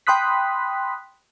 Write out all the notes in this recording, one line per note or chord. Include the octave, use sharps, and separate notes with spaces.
G5 B5 C6 D#6 F#6 B6